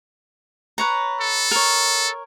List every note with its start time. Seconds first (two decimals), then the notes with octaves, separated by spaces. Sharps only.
0.78 B4 C#5 A#5
1.21 A4
1.51 A#4 C#5